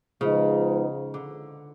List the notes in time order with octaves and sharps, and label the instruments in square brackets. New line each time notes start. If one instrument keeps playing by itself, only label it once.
[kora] C#3 [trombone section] F3 G#3 B3 D#4
[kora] D3